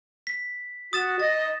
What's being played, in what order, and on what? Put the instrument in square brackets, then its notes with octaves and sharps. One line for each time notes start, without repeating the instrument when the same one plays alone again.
[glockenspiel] B6
[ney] F#4 [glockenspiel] D#6 A6 E7
[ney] D#5 [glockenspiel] A6